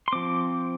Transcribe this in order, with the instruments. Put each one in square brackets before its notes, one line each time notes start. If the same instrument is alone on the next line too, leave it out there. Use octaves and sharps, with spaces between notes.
[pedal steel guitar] C6
F3 C4 D6